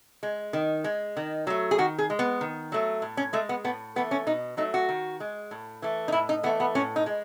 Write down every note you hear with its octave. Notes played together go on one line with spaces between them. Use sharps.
G#3
D#3
G#3
D#3
F#3 A3
G#4
D#3 F#4
G#4
G#3
B3
D#3
F#3 A3
A2
C#4
G#3 A3
B3
A2 B3
E3 A3 B3
C#4
B2 D#4
F#3 A3 D#4
F#4
D#3
G#3
A2
E3 A3
D#4
A2 E4
D#4
E3 A3 B3
B3
A2 C#4
D#4
G#3